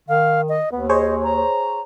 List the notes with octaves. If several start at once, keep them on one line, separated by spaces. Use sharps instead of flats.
D#3 F5
D#5
D#2 B3
G#4 C5 C#5 D#5
A#5